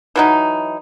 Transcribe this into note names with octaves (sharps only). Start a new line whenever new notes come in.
E3 F#3 D#4